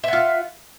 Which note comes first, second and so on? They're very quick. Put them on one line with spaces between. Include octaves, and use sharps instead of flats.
E5 F#5 F4